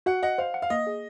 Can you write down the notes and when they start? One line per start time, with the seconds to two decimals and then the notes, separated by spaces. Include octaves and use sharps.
0.06 F#4 F#5
0.23 D#5 F#5
0.38 C5 F5
0.54 F#5
0.62 F5
0.70 A#3 D#5
0.87 G#4